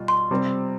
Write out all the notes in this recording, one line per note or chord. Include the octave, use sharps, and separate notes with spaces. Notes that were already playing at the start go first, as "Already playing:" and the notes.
Already playing: B2 G3 F4
C6
C3 G3 C4